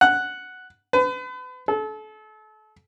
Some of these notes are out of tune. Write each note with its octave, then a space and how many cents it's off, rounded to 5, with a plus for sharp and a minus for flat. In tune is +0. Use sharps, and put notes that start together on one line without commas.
F#5 +0
B4 +35
A4 -35